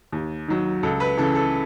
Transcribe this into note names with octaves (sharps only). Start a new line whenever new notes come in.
D#2
D#3 F#3
C#2 A4
B4
C#3 E3 A4
A4